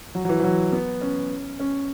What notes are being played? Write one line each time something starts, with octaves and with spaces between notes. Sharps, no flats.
F#3
F#3
E3
E3
F#3
B3
C#4
C#4